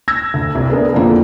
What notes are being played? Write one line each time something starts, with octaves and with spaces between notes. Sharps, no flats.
E6 G#6 A#6
D2
C2
A3 B3 D4 G#4 A#4 B4
F2 D3 F3 A#3 E4